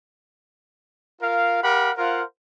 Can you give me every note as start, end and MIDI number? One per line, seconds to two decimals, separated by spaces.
1.21 1.61 65
1.21 1.61 70
1.21 1.61 77
1.63 1.90 67
1.63 1.90 70
1.63 1.90 77
1.63 1.90 78
1.63 1.90 83
1.97 2.22 65
1.97 2.22 70
1.97 2.22 72
1.97 2.22 77
1.97 2.22 78